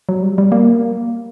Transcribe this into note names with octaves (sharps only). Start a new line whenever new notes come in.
F#3
G3
G3
A#3